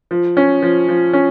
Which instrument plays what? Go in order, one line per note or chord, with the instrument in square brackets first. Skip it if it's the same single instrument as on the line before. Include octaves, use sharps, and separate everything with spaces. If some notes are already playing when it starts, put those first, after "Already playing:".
[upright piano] F3
C#4
F3
F3
C#4